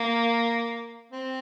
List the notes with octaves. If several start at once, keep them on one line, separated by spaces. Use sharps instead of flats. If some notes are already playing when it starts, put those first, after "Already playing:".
Already playing: A#3
C4